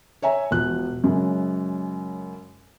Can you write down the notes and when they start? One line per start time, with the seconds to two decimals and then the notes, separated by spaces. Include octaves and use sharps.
0.22 C#5 E5 G#5 A#5
0.51 E1 F3 F#6
1.04 F#2 C#3 G#3